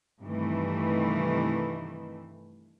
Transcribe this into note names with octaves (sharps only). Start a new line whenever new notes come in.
G2 C3 D#3 E3 A3